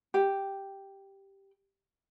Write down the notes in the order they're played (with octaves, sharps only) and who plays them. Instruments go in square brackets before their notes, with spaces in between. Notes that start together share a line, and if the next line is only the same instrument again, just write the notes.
[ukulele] G4 G5